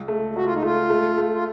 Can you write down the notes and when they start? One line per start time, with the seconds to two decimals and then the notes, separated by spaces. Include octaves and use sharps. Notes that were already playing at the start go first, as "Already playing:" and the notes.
Already playing: C#2
0.08 A3
0.35 C#2 F#4
0.45 F4
0.54 D#4
0.63 A3 F4
0.90 A3
1.18 A3
1.33 F4